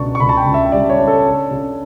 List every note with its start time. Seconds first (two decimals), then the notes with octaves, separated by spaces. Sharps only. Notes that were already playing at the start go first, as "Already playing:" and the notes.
Already playing: C#2 B2 D4 A5 C#6
0.15 C#6
0.20 C#2 B5
0.29 A5
0.37 G5
0.46 C#2
0.54 E5
0.72 G3 D5
0.90 C#5
0.99 D4
1.07 A4
1.25 C#4
1.51 C#3